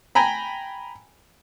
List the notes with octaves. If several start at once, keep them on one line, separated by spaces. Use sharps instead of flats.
G5 G#5 A#5 B5